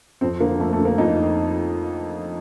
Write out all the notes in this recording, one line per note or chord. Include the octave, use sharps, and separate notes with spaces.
F2 C4
D3 A#3
F2 A3
A3
D3
A#3
F2 D#4